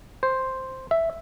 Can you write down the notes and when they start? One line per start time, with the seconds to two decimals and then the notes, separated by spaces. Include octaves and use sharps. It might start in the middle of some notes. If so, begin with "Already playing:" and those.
0.23 C5
0.91 E5